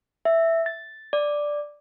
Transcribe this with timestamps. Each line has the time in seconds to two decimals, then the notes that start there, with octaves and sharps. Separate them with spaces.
0.25 E5
0.66 A6
1.13 D5